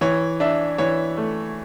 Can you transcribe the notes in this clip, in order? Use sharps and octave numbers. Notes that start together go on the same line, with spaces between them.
E3 C#5
D4 E5
E3 C#5
A3